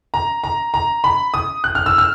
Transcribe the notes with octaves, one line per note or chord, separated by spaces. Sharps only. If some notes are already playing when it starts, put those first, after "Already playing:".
A#5
A#5
A#5
B5
D#6
F#6
F6
E6
F6